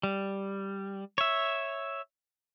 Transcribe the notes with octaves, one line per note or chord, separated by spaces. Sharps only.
G3
C#5 E5